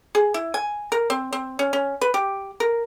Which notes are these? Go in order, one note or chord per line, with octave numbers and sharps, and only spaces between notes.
G#4
E4
G#5
A#4
C4
C4
C#4
C#4
B4
G4
A#4